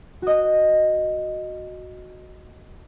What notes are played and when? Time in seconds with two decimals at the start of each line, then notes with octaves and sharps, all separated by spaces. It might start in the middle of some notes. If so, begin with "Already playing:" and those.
0.22 F#4 D#5